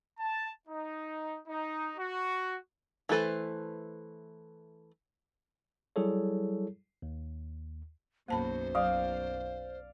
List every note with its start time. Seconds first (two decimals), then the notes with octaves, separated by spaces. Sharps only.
0.19 A5
0.68 D#4
1.48 D#4
1.96 F#4
3.09 E3 A3 A4 B4 C5
5.96 F#3 G3 E4 G#4 A4 C#5
7.02 D#2
8.28 B1 F#2 A#3 C5 A5 B5
8.75 F#3 D5 F5